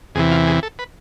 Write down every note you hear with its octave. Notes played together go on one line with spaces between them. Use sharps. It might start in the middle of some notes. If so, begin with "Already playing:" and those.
E2 C3 E3 G#4
F4
G#4
A4
B4